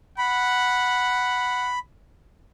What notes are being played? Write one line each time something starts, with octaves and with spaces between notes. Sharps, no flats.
F#5 B5